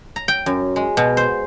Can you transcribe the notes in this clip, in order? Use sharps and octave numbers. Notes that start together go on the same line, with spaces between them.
A#5
G5
F#2
G#3
B2
C5